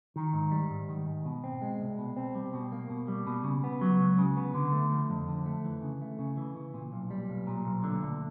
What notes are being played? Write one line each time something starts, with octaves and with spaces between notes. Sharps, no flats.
D#3
G#2
G3
G#2
D#3
G#2
B2
C4
G#3
C2
B2
C4
G3
B2
A#3
B2
G3
B2
C#3
B3
F#3
C#2
C#3
B3
D3
A3
F3
F2
D3
A3
E3
C#3
A3
C#3
E3
C#3
A#2
B1
G3
B1
A#2
B1
D3
D2